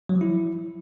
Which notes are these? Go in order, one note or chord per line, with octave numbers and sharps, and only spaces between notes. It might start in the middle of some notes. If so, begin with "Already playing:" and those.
F#3
F3
E4